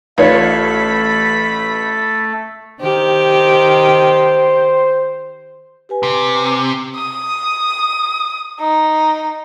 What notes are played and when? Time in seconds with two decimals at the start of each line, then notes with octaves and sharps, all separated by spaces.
0.18 A1 A3 F4 A4 B4 C#5 B5
2.81 D#3 G4 C5
5.89 G4 B4 G#5
6.03 C3
6.96 D#6
8.60 D#4